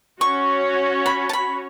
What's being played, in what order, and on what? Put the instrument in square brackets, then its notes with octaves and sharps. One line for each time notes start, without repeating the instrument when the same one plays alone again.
[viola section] C#4 F#4 C#5 [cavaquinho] C#6
[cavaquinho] B5
A5
B5